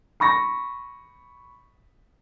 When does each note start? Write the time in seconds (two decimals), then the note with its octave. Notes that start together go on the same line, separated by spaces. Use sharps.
0.20 B5 C#6 A#6